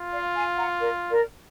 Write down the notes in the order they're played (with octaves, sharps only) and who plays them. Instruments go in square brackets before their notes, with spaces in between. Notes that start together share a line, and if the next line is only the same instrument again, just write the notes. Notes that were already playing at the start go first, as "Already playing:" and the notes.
Already playing: [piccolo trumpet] F4
[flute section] D5 F5
F5 G#5
F#5 A#5
A#4 D5
A#4 D5